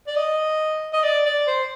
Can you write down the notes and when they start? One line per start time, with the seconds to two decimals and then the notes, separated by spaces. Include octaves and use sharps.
0.07 D5
0.16 D#5
0.93 D#5
1.03 D5
1.25 D5
1.47 C5